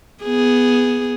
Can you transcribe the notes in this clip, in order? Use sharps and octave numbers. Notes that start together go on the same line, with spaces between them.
B3 G#4